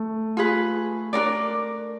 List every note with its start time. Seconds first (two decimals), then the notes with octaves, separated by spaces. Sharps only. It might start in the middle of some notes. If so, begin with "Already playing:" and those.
Already playing: A3
0.37 F4 G#4 B4
1.13 D4 F4 A#4 D5